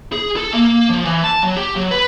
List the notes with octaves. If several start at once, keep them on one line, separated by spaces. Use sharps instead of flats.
G#4
A4
A#3
F3
E3
A5
F#3
G4
F#3
B4